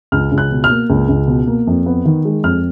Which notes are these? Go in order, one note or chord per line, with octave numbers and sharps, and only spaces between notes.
C#2 F6
C#2
F#6
B2
F6
A#3
C#2
C#2
B2
A#3
F2
B3
D#3
G#3
F2 F6